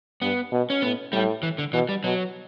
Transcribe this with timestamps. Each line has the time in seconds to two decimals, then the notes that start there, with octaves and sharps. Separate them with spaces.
0.22 G2 B3
0.52 B2
0.70 C#4
0.82 A2 B3
1.12 A2 G3
1.43 E3
1.58 D3
1.73 B2 E3
1.89 G3
2.04 B2 F#3